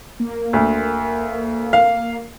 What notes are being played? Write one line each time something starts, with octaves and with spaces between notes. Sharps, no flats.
A#3
D2
F5